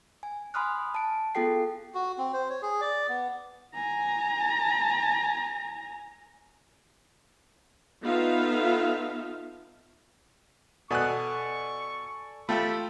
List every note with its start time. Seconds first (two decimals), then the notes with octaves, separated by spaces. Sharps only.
0.23 G#5
0.54 G#5 B5 C6 D#6 F6 F#6
0.94 A5 D7
1.35 B3 F4 G#4 A4 G5 C7
1.95 F#4
2.18 C4
2.33 C5
2.49 C#5
2.62 G#4
2.81 D5
3.09 B3
3.74 G#5 A#5
8.02 B3 D#4 F4 A4 E5 F5
10.91 B2 A4 D5 G#5 C#6 F#6
12.49 A3 F4 G4 G5 A5 B5 E6